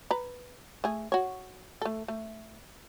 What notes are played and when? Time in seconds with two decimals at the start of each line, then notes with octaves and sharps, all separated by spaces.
0.11 B4 A#5
0.84 A3 G#4
1.12 F#4 C#5
1.82 A3 A4
2.08 A3